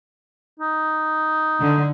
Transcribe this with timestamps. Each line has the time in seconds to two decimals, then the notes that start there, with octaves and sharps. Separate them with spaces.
0.60 D#4
1.60 D3